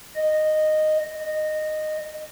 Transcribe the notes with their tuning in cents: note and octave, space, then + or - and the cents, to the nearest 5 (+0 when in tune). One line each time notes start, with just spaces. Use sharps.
D#5 -10
D#5 -15